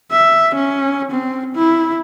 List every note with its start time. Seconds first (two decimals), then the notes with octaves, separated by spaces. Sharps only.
0.12 E5
0.55 C#4
1.11 C4
1.55 E4